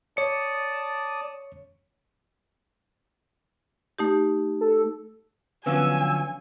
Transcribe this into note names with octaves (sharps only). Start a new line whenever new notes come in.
C#5 D5 A5 D#6 C#7
A3 D#4 G4
A4
D3 F3 F#3 B3 C#4 F5 G#5 E6